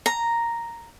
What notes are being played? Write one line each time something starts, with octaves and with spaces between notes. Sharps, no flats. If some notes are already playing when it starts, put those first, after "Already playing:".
A#5